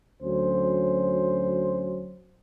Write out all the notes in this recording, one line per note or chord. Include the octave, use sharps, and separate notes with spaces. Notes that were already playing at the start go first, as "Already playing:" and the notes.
D2 F#3 C#4 C5